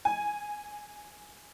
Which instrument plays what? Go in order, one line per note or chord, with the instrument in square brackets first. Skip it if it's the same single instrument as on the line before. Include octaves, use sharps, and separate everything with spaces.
[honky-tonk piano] G#5